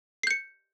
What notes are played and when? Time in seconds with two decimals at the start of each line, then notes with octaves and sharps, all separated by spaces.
0.23 C7
0.27 G6
0.31 C#7